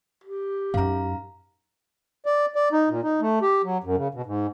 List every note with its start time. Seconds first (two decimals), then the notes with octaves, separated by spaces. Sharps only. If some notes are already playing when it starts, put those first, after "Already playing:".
0.24 G4
0.74 F#2 D#4 F5 A#5
2.26 D5
2.56 D5
2.72 D#4
2.89 A#2
3.03 D#4
3.21 A3
3.42 G4
3.64 F#3
3.84 F#2
3.97 C#3
4.14 B2
4.26 G#2